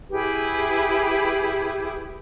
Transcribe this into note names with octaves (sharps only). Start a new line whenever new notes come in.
E4 G4 G#4 B4